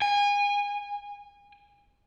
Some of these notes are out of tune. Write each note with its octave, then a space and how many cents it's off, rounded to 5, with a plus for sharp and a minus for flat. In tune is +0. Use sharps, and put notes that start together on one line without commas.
G#5 -30